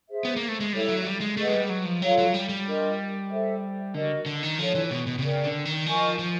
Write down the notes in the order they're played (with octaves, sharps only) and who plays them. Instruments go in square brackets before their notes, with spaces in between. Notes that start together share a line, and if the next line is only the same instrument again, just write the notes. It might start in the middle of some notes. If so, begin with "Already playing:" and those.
[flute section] G#4 C5 E5
[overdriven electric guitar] B3
A#3
A3
G#3
[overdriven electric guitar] G3 [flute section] E4 A4 C#5 E5
[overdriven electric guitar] F#3
G3
G#3
[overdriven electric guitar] A3 [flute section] G#4 B4 D#5 F#5
[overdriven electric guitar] G#3
G3
F#3
F3
[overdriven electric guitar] F#3 [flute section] F4 A4 C#5 F5
[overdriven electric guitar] F#3
G3
G3
[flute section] D4 F4 A#4 D#5
A4 C5 E5
[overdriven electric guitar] D3 [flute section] F#4 A#4 D#5
[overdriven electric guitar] D3
D#3
[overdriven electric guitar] F3 [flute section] D4 F4 A4 C#5
[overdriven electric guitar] E3
B2
B2
C3
[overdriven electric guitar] C#3 [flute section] A#4 D5 G5
[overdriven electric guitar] D3
D#3
[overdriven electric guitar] F3 [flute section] A#4 D#5 G#5 C#6
[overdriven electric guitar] F3